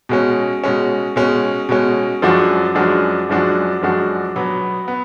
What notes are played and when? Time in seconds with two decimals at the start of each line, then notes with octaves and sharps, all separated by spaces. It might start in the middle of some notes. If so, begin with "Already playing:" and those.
0.09 B2 G#3 C#4
0.64 B2 G#3 C#4
1.16 B2 G#3 C#4
1.69 B2 G#3 C#4
2.22 F#2 F3 G#3 D4 F#4
2.75 F#2 F3 G#3 D4 F#4
3.29 F#2 F3 G#3 D4 F#4
3.82 F#2 F3 G#3 D4 F#4
4.36 B2 F#3 B3
4.88 B3